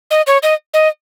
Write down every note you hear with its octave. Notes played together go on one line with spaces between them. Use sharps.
D#5
C#5
D#5
D#5